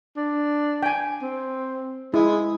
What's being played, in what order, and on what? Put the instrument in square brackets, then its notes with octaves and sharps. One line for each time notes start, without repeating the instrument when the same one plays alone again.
[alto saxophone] D4
[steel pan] G5 G#5
[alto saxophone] C4
[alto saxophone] G#3 [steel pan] E4